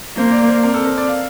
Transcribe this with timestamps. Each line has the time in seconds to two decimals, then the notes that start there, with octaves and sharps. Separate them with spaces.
0.17 A#3 C5
0.32 D5
0.48 C5
0.62 C4 A#4
0.74 A4
0.85 A#4
0.98 D5
1.08 F5